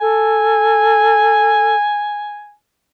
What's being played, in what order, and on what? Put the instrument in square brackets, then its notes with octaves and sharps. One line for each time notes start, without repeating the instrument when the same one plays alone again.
[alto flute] A4 [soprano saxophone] G#5